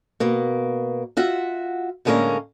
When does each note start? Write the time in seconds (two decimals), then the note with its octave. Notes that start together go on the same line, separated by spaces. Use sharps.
0.20 B2 A#3
1.17 F4 F#4 E5 F#5
2.05 A2 D3 G#3 A#3 C#4 A#5